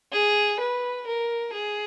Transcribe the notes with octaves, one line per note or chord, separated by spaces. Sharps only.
G#4
B4
A#4
G#4